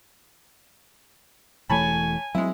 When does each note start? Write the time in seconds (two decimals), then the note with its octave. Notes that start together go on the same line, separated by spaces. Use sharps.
1.70 E1 E3 A3 C#5 G#5 A5 B5
2.35 F#3 G#3 C4 E4